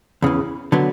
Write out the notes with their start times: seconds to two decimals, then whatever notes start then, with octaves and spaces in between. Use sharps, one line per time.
0.22 E2 C#3 E3
0.72 D3 F#3 B3